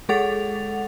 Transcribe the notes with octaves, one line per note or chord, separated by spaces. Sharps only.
G#3 G#4 A4 F#5 A6 F7